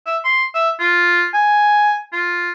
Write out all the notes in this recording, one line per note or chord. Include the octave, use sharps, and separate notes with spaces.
E5
C6
E5
F4
G#5
F4